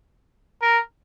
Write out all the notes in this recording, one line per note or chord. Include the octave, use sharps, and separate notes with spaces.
A#4